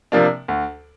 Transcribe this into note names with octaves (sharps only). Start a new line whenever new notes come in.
C3 F3 A#3 D4
D2